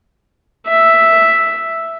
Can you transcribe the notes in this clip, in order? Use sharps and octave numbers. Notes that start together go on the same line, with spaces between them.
E5